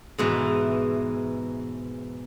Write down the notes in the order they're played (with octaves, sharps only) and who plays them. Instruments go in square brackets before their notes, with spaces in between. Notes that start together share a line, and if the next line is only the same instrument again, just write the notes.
[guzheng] G#2 B2 E3